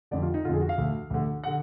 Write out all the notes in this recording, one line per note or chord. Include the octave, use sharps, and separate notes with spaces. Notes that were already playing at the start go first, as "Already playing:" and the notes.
F2 D3 D5
F4
D#4
F2 D3 F4 G#4
F#4
F5
D2 D3
D2 D3
D3 F#5